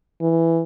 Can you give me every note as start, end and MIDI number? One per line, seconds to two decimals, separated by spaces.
0.21 0.63 52